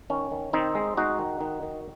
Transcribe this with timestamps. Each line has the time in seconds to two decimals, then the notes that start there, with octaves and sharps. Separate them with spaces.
0.10 D#3 C#4
0.32 D#3
0.53 D#3 C4 D#4
0.75 G#3
0.97 G#3 D#4 F#4
1.19 D#3
1.41 D#3
1.63 D#3